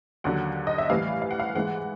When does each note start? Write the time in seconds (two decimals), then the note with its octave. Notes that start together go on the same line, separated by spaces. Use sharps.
0.24 D#2 D3 F#3 F#5
0.67 D#5
0.78 E5
0.90 A2 E3 G3 F5
1.22 F5
1.31 F#5
1.40 F5
1.55 G#2 E3 G#3 F#5